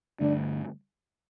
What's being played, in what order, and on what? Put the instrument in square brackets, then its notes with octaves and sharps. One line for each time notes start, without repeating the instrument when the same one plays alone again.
[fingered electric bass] G2 D3 A3 [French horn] D4